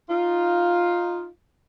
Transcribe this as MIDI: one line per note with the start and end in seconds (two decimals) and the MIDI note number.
0.10 1.27 63
0.10 1.27 65